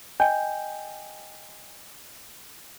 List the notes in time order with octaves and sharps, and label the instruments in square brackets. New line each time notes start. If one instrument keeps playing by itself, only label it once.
[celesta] D#5 G5 G#5 G6